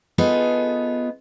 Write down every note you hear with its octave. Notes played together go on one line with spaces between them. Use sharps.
B3 D#4 F4 G#4 A4